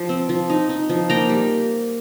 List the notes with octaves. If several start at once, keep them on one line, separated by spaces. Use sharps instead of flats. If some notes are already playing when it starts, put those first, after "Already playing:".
Already playing: F3
C4
F3
D#4
D#4
F3
A#3 G5 A#5
G3